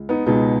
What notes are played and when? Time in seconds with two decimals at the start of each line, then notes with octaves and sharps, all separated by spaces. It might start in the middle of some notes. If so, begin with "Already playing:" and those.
Already playing: C#2
0.09 B3 D#4
0.26 C#2 B2 G#3 B3 D#4